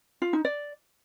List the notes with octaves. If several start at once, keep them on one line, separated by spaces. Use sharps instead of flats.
F4
D#4
D5